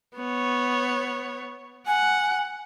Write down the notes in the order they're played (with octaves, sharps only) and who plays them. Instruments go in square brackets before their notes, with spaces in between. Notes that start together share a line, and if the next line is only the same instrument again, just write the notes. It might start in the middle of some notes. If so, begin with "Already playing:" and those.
[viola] B3 C#5
[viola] F#5 [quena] G#5